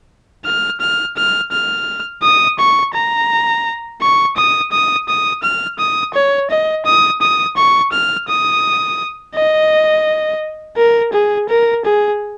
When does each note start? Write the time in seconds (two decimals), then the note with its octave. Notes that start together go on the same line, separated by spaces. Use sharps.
0.45 F6
0.80 F6
1.16 F6
1.52 F6
2.23 D#6
2.59 C#6
2.94 A#5
4.01 C#6
4.37 D#6
4.71 D#6
5.08 D#6
5.43 F6
5.79 D#6
6.14 C#5
6.50 D#5
6.85 D#6
7.21 D#6
7.56 C#6
7.92 F6
8.28 D#6
9.35 D#5
10.77 A#4
11.13 G#4
11.49 A#4
11.85 G#4